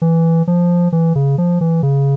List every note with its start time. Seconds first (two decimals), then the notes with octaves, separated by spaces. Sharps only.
0.02 E3
0.47 F3
0.92 E3
1.15 C#3
1.38 F3
1.61 E3
1.83 C#3